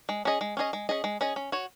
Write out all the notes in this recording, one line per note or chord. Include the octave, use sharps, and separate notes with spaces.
G#3
C#4 G#4 D#5
G#3
C#4 G#4 D#5
G#3
C#4 G#4 D#5
G#3
C#4 G#4 D#5
C#4
F#4 C#5